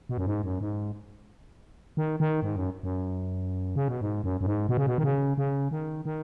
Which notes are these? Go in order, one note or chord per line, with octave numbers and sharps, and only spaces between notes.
B2
F#2
G#2
F#2
G#2
D#3
D#3
G#2
F#2
F#2
C#3
B2
G#2
F#2
F#2
G#2
B2
C#3
B2
D#3
C#3
C#3
D#3
D#3